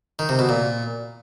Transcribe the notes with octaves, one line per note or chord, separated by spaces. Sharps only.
D#3
C3
B2
A#2